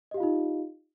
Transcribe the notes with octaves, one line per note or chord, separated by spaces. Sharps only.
D#4 F4 G4 D#5 F5